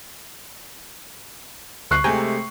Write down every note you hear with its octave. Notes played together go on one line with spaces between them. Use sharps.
D2 C#6 F#6 C7
C3 G#3 A3 G5 G#5 A#5